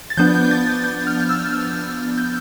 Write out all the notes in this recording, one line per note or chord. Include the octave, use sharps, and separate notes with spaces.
A6
F3 B3 D4 G6
A6
G6
F6
E6
F6
G6